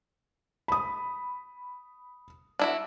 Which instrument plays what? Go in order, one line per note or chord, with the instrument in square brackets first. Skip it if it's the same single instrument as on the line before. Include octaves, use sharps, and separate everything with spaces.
[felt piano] B5 D#6
[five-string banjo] D4 E4 F#4